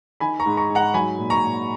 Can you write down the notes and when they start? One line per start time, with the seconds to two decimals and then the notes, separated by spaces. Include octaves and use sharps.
0.20 D#3 G#5 B5
0.40 A#5 C#6
0.46 G#2
0.57 A#5 C#6
0.70 G#2
0.75 F#5 A#5
0.94 F#3 G#5 B5
1.18 A#2
1.30 A#5 C#6
1.43 A#2